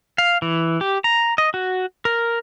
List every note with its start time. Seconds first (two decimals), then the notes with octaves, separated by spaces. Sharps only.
0.18 F5
0.42 E3
0.81 G4
1.04 A#5
1.38 D#5
1.54 F#4
2.05 A#4